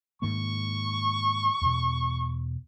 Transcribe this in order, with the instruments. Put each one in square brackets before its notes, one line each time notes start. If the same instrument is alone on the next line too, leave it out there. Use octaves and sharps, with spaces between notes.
[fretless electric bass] G#2 D#3 A#3 [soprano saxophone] C#6
[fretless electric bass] E2 B2